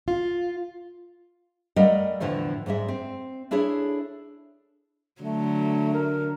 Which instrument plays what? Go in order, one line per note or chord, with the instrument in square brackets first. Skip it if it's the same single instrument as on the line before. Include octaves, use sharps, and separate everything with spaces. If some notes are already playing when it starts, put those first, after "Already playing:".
[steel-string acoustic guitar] F4
[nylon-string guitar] G3 A3 A#4 D#5 F5 F#5
E2 A2 D3 E3 F3 A3
G#2 G3 G#3 E5
C4
D4 E4 G#4 A4 C#5 E5
[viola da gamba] D3 F#3 [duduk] A3
[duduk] A#4